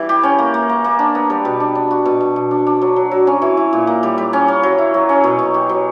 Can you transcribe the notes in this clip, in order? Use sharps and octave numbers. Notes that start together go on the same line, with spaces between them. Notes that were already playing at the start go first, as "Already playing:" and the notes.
Already playing: E3 G3
G4
C#4
A#3
A#3
A#3
A#3
D4
B3
G3
B2
D4
D4
F#4
B2
B2
B2
D4
D4
F#3
F#3
F#3
C#4
E3
E4
A#2
A#3
G3
G3
C#4
C#4
F#3
E4
F#3
C#4
B2
B2
G4
F#3